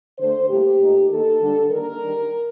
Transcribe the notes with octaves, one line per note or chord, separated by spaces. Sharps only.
D3 A3 D4 C5
A2 G3 A#3 G4
A#2 A3 D#4
D#3 A#3 D#4 A4
D3 G3 D4
D#3 G3 A#3 D4 A#4
D#3 G3 D4